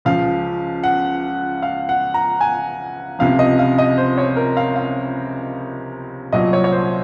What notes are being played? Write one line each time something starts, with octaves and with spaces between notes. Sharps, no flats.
C#2 C#3 F3 F5
F#5
F5
F#5
A#5
G#5
C#2 C3 F3 F5
D#5
F5
D#5
C5
C#5
A#4
F5
F5
C2 A#2 F#3 D#5
C#5
C#5
C5